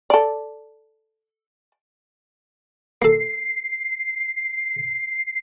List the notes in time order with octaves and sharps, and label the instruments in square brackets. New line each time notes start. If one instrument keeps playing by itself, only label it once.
[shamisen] A4 D5
[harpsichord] A#3 A4 [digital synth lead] C7